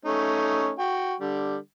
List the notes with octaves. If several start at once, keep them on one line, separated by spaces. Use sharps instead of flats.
A3 C#4 D#4
F#4 G5
D3 G3